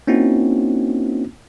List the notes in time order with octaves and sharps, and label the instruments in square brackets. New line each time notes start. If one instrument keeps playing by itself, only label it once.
[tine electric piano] A#3 C4 C#4 D#4 E4 F#4